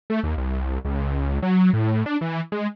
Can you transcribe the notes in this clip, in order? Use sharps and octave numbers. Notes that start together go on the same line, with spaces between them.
A3
D#2
C2
C#2
F#3
A2
D4
E3
G#3